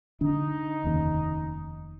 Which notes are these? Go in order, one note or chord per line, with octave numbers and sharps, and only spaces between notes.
D3 D4 D#4
F1 D#2 C#3